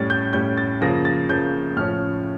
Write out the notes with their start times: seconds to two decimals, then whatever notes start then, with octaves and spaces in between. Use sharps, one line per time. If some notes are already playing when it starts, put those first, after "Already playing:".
Already playing: A2 G3 C#4 A6
0.10 G6
0.33 A2 G3 C#4 G6
0.57 A6
0.81 C#3 F3 A#3 A#6
1.05 A6
1.29 C#3 F3 A#3 G6
1.76 A2 F3 C#4 F6